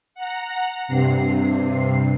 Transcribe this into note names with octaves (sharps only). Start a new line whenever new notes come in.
F#5 A#5
G2 C3 C7